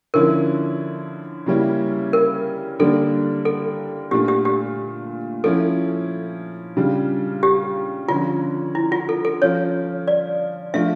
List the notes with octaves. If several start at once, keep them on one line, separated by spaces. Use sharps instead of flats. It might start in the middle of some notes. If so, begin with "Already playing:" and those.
D3 F3 C#4 E4 A#4
C#3 G3 A#3 C#4 E4
A#4
D3 G3 A#3 D4 A4
A4
A#2 A3 D4 F4 G4
G4
G4
F3 C#4 E4 A4
C#3 G3 D4 F4
G4
D3 F3 C#4 F4
E4
F4
A4
A4
F3 C#4 F4 C#5
D5
F3 A3 D4 F4 E5